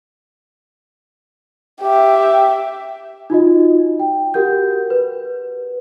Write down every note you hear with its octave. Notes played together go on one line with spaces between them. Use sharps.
G4 E5
D#4 F4 F#4 D#5
G5
F#4 G4 A#4 F#5 G6
B4